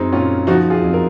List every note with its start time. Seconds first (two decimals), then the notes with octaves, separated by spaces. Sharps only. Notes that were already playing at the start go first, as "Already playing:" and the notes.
Already playing: F#2 G#3 C4 D#4
0.12 A#2 C#4 F4
0.47 F3 D#4 F#4
0.70 F4 G#4
0.82 F2
0.94 A#4